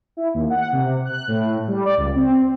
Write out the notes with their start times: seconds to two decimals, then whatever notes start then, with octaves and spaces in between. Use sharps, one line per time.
0.17 E4
0.34 D#2
0.50 F#5
0.72 C3
1.05 F#6
1.28 A2
1.68 G3
1.85 D5
1.97 C#2
2.16 C4